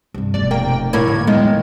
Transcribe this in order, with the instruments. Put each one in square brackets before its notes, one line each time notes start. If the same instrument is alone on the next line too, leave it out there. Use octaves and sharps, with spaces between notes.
[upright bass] G2 C3
[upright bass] F1 B2 [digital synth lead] D5
[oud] A#3 [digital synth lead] G5
[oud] A2 A#3 D4 [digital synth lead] G#6
[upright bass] D3 F3
[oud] D#3 [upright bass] F#3 B3 [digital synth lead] G#3